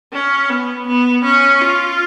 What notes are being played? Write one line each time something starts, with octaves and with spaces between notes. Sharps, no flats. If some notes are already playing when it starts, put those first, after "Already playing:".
C#4
B3
B3
C#4
F4